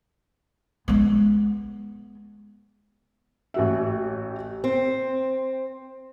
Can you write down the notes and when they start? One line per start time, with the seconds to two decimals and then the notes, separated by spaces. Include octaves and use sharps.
0.88 G#3 B3
3.54 A1 F#4 E5
4.64 C4